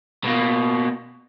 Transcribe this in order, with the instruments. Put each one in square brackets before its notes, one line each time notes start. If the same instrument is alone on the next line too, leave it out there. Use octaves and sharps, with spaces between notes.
[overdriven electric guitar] B2 A#3